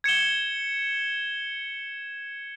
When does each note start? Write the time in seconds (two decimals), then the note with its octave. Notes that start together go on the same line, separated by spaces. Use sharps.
0.04 G#6 C#7 E7 G7